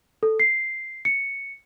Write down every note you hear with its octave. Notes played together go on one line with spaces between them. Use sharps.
A4
C7
C#7